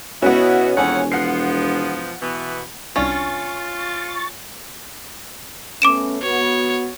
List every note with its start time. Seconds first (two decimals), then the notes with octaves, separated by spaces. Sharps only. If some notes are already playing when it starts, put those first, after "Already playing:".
0.22 B2 B3 C#4 E4 F#4
0.77 E1 F2 C#5 F#5 G#5
1.12 F3 B3 F#5 C7
2.21 B2 E3 B3
2.96 C2 C#4 D4 F4 F5 C#6 A6
5.82 A3 B3 C#4 D6 D7 E7
6.22 B3 F#4 C#5